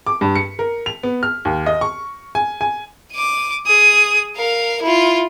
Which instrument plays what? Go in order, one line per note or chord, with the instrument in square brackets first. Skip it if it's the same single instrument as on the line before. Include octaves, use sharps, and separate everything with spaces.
[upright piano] D6
G2
C#7
A#4
F7
B3
F6
D#2
D#5
C#6
G#5
G#5
[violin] D6 D#7
G#4 D#6
A#4 F5
E4 F4